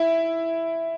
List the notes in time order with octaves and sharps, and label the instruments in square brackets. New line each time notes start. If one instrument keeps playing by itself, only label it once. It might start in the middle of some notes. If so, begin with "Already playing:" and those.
Already playing: [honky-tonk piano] E4